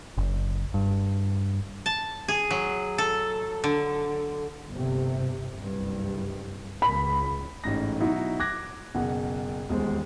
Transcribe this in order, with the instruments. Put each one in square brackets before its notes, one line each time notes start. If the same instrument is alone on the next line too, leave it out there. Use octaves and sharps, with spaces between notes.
[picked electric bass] F#1
G2
[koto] A5
G#4
F#3
A4
D3
[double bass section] G1 C3
F#1 C2 G2
[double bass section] C#2 [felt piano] B5
[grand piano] A1 G#2 A#6
B2 F#3 D#4 E4 F#4
D6 F#6 G#6 A#6
F#1 B2 F#5
D#1 E2 G#3 C5